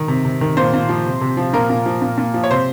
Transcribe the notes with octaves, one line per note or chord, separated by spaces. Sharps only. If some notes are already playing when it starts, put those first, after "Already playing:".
Already playing: D#3
C3
C3
D#3
A#2 C5
A#2
F3
C3
C3
F3
A#2 A#4
A#2
F3
A#2
A#2
F3
C#5
C3 C5